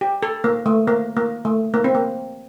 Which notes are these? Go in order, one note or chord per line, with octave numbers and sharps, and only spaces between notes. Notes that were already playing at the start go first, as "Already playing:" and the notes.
G4
A4
A#3
A3
A#3
A#3
A3
A#3
C4
A#3